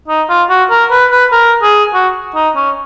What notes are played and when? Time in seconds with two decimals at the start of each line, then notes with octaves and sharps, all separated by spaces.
0.08 D#4
0.29 F4
0.49 F#4
0.70 A#4
0.91 B4
1.11 B4
1.32 A#4
1.62 G#4
1.94 F#4
2.35 D#4
2.56 C#4